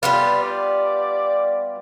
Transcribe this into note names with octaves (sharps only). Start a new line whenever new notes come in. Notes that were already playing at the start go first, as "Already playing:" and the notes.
G3 B3 F4 B4
D5